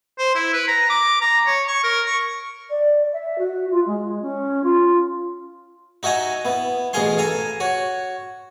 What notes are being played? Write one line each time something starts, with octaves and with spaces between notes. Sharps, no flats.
C5
E4
B4
A#5
D6
A#5
C#5
C#6
A#4
C#6
D5
E5
F#4
F4
G#3
C#4
F4
D#4 F#4 E5 G#5 A#5
B3 E4
A1 B2 G#4 F5 G#5 C6
A4 F5 G#5 A#5
F#4 C#5